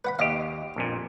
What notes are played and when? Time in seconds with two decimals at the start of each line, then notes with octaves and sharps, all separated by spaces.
0.05 B4 F#5 B5
0.19 D#2 G4 D#5 F5
0.76 A#1 F2 A#2